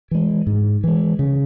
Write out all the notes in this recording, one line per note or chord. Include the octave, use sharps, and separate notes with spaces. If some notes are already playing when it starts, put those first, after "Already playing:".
E3 G#3
G#2
E3 G#3
C#3